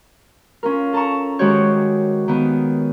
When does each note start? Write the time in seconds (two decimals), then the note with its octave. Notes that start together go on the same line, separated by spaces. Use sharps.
0.63 C#4 F4 A#4
0.93 A4 A5 A#5 C#6
1.39 D#3 G#3 F#4 G4 C5 C#5
2.28 D#3 B3